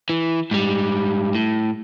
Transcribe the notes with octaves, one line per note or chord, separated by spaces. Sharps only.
E3
G#2 G3
A2